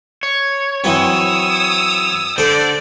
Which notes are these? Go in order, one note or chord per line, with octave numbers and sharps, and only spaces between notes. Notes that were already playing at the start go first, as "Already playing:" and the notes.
C#5
E3 F#3 C4 D#6 E6
D3 A4 C5 D5 G6